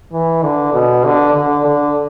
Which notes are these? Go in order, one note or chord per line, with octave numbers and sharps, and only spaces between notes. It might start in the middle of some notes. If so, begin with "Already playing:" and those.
E3
D3
B2
D3
D3
D3